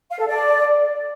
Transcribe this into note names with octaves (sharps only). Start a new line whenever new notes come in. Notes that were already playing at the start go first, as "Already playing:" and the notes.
F5
A4
D5